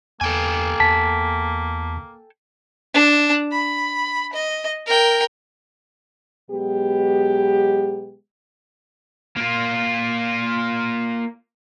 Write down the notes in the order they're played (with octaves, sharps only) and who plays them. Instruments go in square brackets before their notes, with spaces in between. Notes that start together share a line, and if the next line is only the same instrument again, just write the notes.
[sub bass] E2 [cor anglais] A#3 [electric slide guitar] A4 G5 G#5
[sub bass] E2 [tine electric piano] A5 B6
[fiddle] D4
B5
D#5
A#4 G5
[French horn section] B2 F#3 G#3 B3 G4
[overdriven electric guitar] A#3 F4